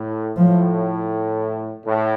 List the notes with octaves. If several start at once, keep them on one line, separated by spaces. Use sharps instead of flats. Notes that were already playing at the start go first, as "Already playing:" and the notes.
Already playing: A2
A2 F3
A2